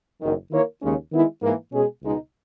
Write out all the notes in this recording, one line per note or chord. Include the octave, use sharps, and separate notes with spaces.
F#1 F#2 D#3
D#3 A#3 E4 A#4 C#5
D#2 C#3 G#3 C#4
D#3 G#3 B3 E4
G#2 E3 A#3
B2 G#3 C#4 G#4
C#2 B2 G#3 D#4